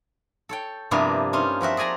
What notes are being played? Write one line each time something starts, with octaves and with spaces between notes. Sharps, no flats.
A4 C#5 G5
G2 C3 F3 A#3 B3 E4
C#4 D#4 F4
F3 C4 F#4 E5
G#4 D5 G#5 A#5